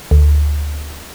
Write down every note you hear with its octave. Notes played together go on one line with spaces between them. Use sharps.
D2